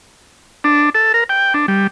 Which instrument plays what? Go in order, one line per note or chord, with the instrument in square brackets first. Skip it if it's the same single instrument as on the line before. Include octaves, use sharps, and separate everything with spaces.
[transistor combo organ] D4
A4
A#4
G5
D4
G3